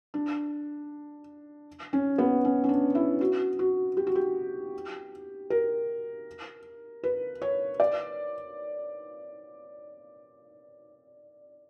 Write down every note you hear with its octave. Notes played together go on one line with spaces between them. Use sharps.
D4
C#4
B3
C#4
C#4
D4
E4
F#4
F#4
G4
F#4
G4
A#4
B4
C#5
D5